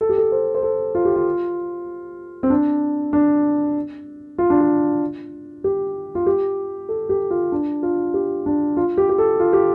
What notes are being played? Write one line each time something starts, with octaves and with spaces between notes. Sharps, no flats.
A4
G4
A4
C5
C5
A4
F4
G4
F4
C4
D4
D4
F4
D4
F4
G4
F4
G4
A4
G4
F4
D4
F4
G4
D4
F4
G4
G4
A4
F4
G4